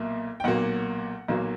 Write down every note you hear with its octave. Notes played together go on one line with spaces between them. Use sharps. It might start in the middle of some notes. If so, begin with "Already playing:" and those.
Already playing: B1 A#2 A#3 E5
G5
B1 A#2 F#3 A#3 F#5
B1 A#2 F#3 A#3